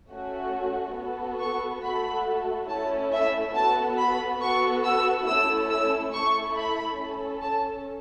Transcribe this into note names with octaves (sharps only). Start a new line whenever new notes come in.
A3 C#4 F#4
B3 F#4 A4
C#6
A3 F#4 A4 B5
A3 C#4 E4 A4 A5
E5
B3 F#4 A4 A5
B5
B3 F#4 A4 C#6
E6
A3 C#4 E4 A4 E6
E6
A3 E4 A4 C#6
B5
C#4 A4
A5